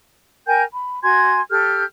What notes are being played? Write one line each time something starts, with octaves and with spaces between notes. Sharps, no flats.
A#4 G5 G#5 G6
B5
F#4 G#5 C6 G#6
G4 A4 F6 G6